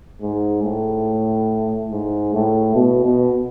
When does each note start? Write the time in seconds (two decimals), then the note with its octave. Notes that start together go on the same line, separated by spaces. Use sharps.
0.21 G#2
0.63 A2
1.91 G#2
2.33 A2
2.75 B2
3.04 B2